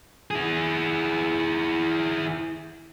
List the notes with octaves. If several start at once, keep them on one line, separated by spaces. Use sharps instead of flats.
E4 G#4